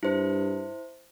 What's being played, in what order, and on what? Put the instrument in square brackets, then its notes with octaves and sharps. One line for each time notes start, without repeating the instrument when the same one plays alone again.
[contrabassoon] G2 [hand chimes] E4 C5